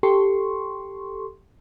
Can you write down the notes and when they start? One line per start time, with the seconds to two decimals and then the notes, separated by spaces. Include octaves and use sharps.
0.03 G4 A4 C6 C#6